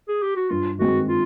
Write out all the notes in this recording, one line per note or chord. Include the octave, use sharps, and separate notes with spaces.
G#4
G4
F#4
G2 F4
D#3 G#3 C4 F#4
F4